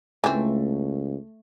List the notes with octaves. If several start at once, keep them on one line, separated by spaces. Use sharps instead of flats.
C#2 E3 A3 C4